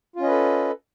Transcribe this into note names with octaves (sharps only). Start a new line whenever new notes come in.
C#4 F4 A4 B4 D#5